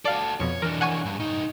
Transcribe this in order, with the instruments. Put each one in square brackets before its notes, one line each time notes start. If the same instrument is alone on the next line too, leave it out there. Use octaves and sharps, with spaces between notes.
[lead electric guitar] F#4 A4 [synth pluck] D5 F5
[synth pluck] F2 B2 [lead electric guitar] C#5
[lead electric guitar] E3 D4 [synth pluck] A#4
[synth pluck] F#5 G#5 C#6
[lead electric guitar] G2
C2 D#4